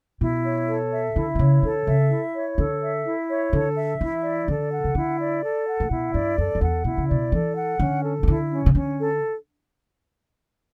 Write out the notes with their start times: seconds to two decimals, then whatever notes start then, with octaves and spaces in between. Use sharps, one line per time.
0.21 B2 E4
0.44 C#5
0.68 A4
0.92 E5
1.16 D3 E4
1.35 D3
1.39 C#3 C#5
1.63 D3 A4
1.87 C#3 E5
2.11 E4
2.34 C#5
2.58 D3 A4
2.82 E5
3.06 E4
3.29 C#5
3.53 D3 A4
3.77 E5
4.01 E3 E4
4.24 D5
4.48 D3 A4
4.72 F#5
4.84 C#3
4.95 D3 E4
5.19 D5
5.42 A4
5.66 F#5
5.80 A2
5.90 B2 E4
6.14 G2 D5
6.38 F#2 A4
6.55 F#2
6.61 E2 F#5
6.84 B2 E4
6.98 C#3
7.09 B2 D5
7.32 E3 A4
7.57 F#5
7.80 D3 C#4
8.03 A4
8.23 E3
8.27 D3 E4
8.51 C#4
8.66 C#3
8.75 D3 C#4
8.99 A4